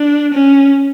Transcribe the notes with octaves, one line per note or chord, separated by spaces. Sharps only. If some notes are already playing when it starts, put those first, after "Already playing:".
Already playing: D4
C#4